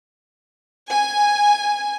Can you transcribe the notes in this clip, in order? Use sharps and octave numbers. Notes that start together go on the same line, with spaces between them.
G#5